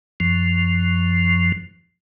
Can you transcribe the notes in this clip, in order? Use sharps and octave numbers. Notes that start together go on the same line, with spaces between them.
F#2 F3